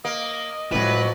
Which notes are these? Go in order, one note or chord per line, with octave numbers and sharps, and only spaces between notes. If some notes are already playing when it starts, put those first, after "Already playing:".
A#3 D#5
F2 A2 F#3 G#3 E4 B4